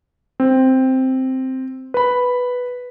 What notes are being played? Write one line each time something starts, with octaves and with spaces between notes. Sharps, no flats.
C4
B4 B5